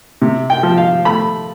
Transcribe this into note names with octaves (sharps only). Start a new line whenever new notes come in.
C3
G5
F3
F5
A3 B5